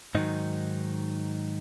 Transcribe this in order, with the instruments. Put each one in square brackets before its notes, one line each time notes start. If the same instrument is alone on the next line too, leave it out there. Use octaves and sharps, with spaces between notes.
[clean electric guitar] G#2 D#3 F#3 D#4